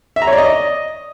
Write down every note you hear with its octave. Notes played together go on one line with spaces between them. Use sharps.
E5
A#5
C#5
D5
D#5